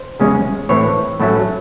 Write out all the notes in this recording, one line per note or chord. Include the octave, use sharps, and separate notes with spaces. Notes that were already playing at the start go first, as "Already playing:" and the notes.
Already playing: C5
E2 C#3 G#3 C#4
A2 E3 C4 C#5
A2 F#3 A3 C#4